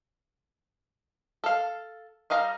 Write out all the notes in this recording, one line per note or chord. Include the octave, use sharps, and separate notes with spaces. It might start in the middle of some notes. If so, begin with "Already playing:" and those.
A4 F5
G3 D#4 F5 A#5